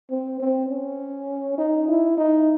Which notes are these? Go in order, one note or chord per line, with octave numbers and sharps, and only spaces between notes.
C4
C4
C#4
D#4
E4
D#4